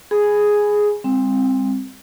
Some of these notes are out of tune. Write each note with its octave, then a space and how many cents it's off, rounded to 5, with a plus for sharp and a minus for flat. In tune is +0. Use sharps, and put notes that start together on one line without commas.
G#4 +0 G#5 +0 B5 +10
G3 +45 C4 +0